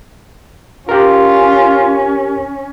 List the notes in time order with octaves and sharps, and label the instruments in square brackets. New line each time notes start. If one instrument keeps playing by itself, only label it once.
[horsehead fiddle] C#4 [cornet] F4 [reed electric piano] G4 A#4